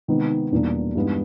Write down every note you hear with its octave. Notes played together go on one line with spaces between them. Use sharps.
C3 D#3 G#3 B3 D#4
E2 B2 G3 A#3 D4
G2 E3 G#3 B3